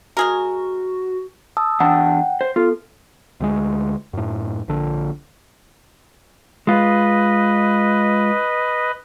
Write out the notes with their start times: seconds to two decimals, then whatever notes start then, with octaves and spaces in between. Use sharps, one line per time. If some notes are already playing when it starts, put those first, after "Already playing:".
0.17 G#3 F#4 G#4 A#4
1.57 A5 D#6 E6
1.80 E2 D4 F#5 G5 A5
2.41 C5
2.56 B3 F4 A4
3.40 D2 G3 G#3
4.13 F#2 A2
4.68 A#1 D3
6.67 G#3 F4 B4 D#5